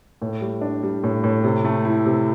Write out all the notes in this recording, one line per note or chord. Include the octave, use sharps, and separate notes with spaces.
A2
G3
D4
G3
A2
A2
C3
A3
E4
C3